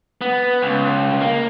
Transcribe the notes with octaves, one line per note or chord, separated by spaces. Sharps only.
B3
C#2
A#3